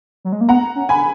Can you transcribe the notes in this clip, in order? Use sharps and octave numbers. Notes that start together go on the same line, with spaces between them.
F#3
G#3
A#3
B3 F#5 A#5
C#4
G#5 B5